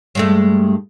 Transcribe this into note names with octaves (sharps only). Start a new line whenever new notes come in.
G2 G#3 A3